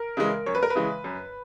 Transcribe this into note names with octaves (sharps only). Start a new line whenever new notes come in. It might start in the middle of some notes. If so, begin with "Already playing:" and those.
Already playing: A#4
C#3 E3 G#3
F#2 C#5
B4
A#4
B4
C#3 E3 G#3
F#2